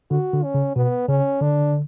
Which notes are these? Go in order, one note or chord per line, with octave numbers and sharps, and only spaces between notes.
D3 F#4
D3
C#4
C#3
B2 B3
C#3 C#4
D3 D4